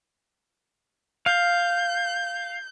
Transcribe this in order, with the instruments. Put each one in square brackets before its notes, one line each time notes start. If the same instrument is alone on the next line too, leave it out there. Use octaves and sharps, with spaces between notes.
[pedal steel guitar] F5 [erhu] G6